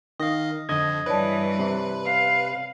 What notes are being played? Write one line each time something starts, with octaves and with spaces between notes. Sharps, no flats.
D#3 D#5 F5 D#6 A#6
F2 D3 D#5 G#6
G2 E3 B4 C#5 D5 A5
C3
F5